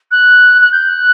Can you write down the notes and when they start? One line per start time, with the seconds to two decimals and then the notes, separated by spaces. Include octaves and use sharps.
0.11 F#6
0.61 F#6
0.72 G6
0.89 F#6